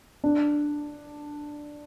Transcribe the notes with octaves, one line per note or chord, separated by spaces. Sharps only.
D4